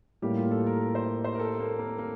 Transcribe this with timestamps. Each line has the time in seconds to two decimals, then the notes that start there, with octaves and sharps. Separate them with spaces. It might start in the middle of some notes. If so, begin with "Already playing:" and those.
0.22 A2 G3 A#3 G4
0.37 F4
0.51 A4
0.66 A#4
0.81 A#4
0.95 C5
1.24 C5
1.35 A#4
1.40 A4
1.60 A#3
1.79 A#3
1.98 A#3